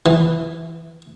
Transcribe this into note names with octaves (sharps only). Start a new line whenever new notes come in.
E3